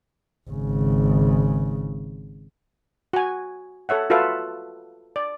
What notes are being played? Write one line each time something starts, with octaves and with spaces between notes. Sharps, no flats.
G#1 C#3
F#4 G#5
A4 C#5 E5 F#5
F4 F#4 A4 B4 E5 F5
D5